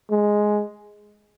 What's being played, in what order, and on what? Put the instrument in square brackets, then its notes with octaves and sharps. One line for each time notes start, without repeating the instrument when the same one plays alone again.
[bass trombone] G#3